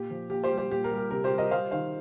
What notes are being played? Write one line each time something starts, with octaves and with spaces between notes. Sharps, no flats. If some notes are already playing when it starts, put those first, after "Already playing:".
Already playing: A#2 G4
F3
A#2 G4
G4 C5
G3
G4 C5
A#2 G4
A#4
G3
A#4
C3 A#4
G4 C5
G3
A#4 D#5
G3 C5 F5
D#3 C5 F5